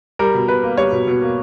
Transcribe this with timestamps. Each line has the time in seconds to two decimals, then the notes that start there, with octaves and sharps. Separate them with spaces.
0.19 G3 A#4
0.34 B2
0.48 B2 B4
0.63 A#3
0.78 G3 C#5
0.92 B2
1.07 B2
1.22 A#3